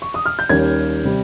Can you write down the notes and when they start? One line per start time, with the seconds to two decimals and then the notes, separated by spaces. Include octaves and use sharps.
0.02 C#6
0.14 D#6
0.26 F6
0.39 G6
0.49 D#2 D#3 G3 A#3 C#4 G#6
1.04 C3 G3 C4